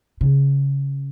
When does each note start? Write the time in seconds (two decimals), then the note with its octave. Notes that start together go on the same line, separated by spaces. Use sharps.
0.21 C#3